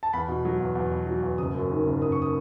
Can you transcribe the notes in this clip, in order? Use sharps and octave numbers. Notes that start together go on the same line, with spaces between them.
A5
E2 B5
B2
F#3
E2
E2
B2
F#3
E2
F#1 D#6
F#2
D#3
F#1
F#1 D#6
C#6
D#6